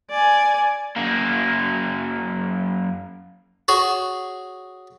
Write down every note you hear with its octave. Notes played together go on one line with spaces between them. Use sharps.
D5 G#5
F#2 A#3
F#4 G#4 C#5